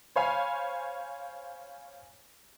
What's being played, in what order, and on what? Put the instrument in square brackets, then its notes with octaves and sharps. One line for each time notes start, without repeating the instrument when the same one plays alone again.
[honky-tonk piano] C5 C#5 F5 G#5 B5